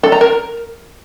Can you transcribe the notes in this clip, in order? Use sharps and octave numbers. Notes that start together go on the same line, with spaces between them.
A4
A#5
A#4